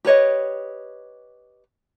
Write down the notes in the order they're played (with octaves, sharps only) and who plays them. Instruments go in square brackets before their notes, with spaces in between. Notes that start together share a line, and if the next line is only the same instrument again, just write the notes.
[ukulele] G4 B4 C#5 D#5